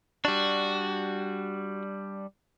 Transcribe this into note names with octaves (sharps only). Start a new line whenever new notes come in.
G3 D4 F#4